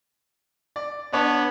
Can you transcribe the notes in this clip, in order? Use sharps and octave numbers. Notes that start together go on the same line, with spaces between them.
D5
B3 D4 C#5 A5